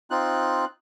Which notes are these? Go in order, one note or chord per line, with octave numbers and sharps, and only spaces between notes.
C4 D#4 F4 F#6